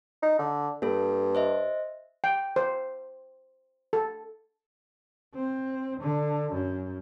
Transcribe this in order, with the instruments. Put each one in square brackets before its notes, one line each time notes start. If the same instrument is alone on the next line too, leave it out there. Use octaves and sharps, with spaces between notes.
[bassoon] D#4
D3
[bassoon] G2 [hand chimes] A#3 A4
[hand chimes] C5 D#5 E5
[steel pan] G5
C5
A4
[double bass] C4
D3
F#2